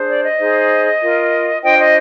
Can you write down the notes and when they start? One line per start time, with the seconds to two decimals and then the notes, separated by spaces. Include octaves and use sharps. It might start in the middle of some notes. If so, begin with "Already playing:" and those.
Already playing: D4 G#4 C5
0.09 D5
0.24 D#5
0.39 D#4 G#4 C5
1.01 F4 A#4
1.63 D4 F4 C5 D#5 G5
1.79 D#5